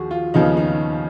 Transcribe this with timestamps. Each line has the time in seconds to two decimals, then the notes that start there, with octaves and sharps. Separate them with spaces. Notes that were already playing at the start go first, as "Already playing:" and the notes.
Already playing: D#2 F3 F#4 G#4
0.11 F4
0.34 D#2 C#3 F3 B3 D#4
0.57 D#4